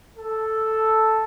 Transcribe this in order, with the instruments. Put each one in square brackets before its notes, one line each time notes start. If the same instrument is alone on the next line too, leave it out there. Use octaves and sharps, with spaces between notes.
[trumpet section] A4